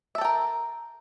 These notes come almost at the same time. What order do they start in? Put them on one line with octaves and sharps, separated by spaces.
E5 A4 G5 A#4